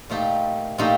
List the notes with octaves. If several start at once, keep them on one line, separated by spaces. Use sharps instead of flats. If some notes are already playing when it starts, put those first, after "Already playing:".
A#2 A3 D#4 G4
A#2 A3 D#4 G4